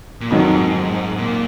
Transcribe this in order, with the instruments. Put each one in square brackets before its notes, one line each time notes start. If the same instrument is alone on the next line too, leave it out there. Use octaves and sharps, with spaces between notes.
[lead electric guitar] A#2
[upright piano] F2 D#3 F#3 [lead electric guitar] G#2
[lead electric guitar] A#2